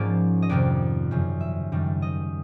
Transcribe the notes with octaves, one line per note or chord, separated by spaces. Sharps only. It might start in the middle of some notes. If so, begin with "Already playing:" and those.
Already playing: G#2 F3 A#3 C#4 D5
D#5
F2 C3 D#3 D5
F#2 C#3 F3
E5
F#2 D#3 G3
D#5